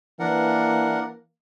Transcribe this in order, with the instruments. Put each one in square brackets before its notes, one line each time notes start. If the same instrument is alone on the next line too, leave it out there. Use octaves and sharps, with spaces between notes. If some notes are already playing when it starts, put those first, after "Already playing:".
[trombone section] E3 A#3 [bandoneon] D4 A#4 F#5